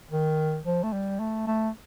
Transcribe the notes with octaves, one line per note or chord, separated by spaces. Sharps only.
D#3
F3
A3
G3
A3
A3